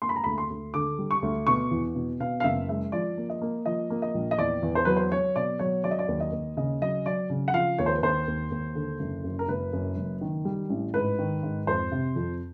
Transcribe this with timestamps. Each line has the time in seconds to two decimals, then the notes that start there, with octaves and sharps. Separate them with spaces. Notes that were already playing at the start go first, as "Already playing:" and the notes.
0.02 A#3 C6
0.09 B5
0.16 A#5
0.24 D2 B5
0.38 C6
0.50 D2
0.74 D3 D6
0.98 G3
1.11 C#6
1.22 D2
1.47 B2 C#6
1.71 E2
1.95 B2
2.20 B2 F5
2.40 F5
2.44 F#1 E5
2.68 G#3 E5
2.92 F3 D5
3.17 A#3
3.30 D#5
3.41 A#3
3.66 F3 D#5
3.90 A#3
4.02 D#5
4.14 A#1
4.31 D#5
4.38 E2 D5
4.62 E2
4.75 C5
4.85 F#3 B4
4.96 C5
5.12 F#3 C#5
5.36 B2 D5
5.59 F#3 C#5
5.84 F#3 D5
5.91 D#5
5.99 D5
6.08 D#2
6.20 D#5
6.32 D#2
6.57 C#3 D#5
6.81 F#3 D#5
7.05 F#3 D5
7.30 C#3
7.48 F#5
7.54 F3 F5
7.78 D#2 C#5
7.86 C5
7.95 B4
8.03 D#2 C5
8.27 D#2
8.51 D#2
8.75 D3
8.99 F#1
9.24 F#2
9.39 A#4
9.48 F#1 B4
9.73 F#2
9.97 F#1
10.21 D#3
10.45 G3
10.70 A1
10.94 G#2 B4
11.19 D#3
11.43 G#2
11.67 F2 C5
11.91 C3
12.16 F2